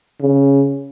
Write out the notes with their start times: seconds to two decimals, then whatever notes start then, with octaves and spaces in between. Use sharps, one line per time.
0.21 C#3